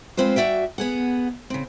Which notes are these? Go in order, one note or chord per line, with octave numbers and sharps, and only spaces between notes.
F2 G#3 C4 F4 B4 C5
G2 F#4 D5 E5 G5
B3 G#4 F#5
C#3 C4